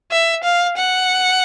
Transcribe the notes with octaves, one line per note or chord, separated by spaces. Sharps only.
E5
F5
F#5